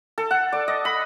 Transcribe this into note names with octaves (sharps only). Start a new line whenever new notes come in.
A4
F#5
D5
D#5
B5